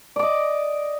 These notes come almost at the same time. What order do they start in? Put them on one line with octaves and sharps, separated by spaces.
D5 D6 D#5